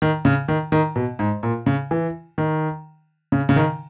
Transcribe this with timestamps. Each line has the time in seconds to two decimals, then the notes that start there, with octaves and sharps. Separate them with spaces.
0.02 D#3
0.25 C#3
0.48 D#3
0.72 D#3
0.96 B2
1.19 G#2
1.43 A#2
1.66 C#3
1.91 E3
2.38 D#3
3.32 C#3
3.49 C#3
3.56 D#3